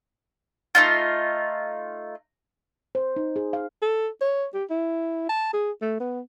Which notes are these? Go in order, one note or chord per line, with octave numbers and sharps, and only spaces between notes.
A3 D#4 F4
C5
D#4
G#4
F5
A4
C#5
G4
E4
A5
G#4
A3
B3